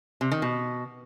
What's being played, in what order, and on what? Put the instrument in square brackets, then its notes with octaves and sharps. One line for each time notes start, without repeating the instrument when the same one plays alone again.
[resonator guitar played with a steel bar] C3
D#3
B2